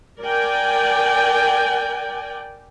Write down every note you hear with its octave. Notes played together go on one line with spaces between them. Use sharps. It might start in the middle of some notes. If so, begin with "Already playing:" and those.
A#4 D5 G5 G#5